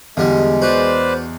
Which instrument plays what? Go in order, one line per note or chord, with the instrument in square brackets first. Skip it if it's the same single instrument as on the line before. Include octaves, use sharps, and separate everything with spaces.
[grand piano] E2 B2 [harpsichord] D3 G3 [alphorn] G#3
[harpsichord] F#4 [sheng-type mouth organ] B4 C5 D5